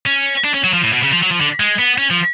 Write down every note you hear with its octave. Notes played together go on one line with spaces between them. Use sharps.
C#4
D4
C#4
F#3
F3
A2
B2
C#3
F3
F#3
F3
D3
G#3
B3
C#4
F3